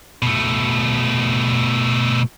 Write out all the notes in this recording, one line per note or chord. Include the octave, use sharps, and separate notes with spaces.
B2 A3